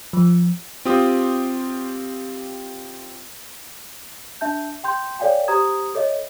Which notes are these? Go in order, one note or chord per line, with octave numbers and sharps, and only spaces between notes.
F3
C4 F4 G4 D#6
D4 E5 A5 G6
G5 C6 G6
A4 C#5 D5 F5 G5 G#5
G4 C5 A#5 D#6 G#6
A4 C#5 D#5 E5